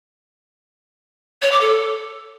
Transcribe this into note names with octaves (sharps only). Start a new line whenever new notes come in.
C#5
D6
A4